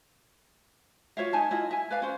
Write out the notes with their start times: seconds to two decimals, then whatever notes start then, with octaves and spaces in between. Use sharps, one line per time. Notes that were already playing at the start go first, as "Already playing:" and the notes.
1.17 F4 C#5 E5 F5
1.33 D#4 G#5 A5
1.51 E4 F4 D#5
1.71 E5 G#5
1.90 B4 D5 F5
2.02 C#4 C5